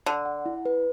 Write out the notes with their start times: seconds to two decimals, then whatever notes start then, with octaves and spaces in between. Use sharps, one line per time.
0.06 D3 D5
0.25 F#5
0.46 E4
0.65 B4